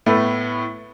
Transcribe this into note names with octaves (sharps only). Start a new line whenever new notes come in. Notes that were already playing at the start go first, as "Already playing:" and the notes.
A2 A3 B3